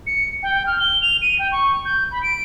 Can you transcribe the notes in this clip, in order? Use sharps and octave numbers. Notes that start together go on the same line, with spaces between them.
C#7
G5
F6
G7
F7
D#7
G5
C#6
G6
B5
D7